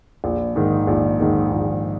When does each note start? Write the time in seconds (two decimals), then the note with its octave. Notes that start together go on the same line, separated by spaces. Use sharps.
0.24 A#1
0.56 G#2 D#3
0.87 A#1
1.20 G#2 D#3
1.52 A#1